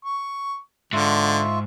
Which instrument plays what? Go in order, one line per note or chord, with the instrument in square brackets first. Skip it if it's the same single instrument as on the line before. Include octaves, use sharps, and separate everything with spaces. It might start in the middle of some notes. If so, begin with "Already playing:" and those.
[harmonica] C#6
[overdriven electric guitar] G#2 [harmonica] D3 [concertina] F4 E5 C#6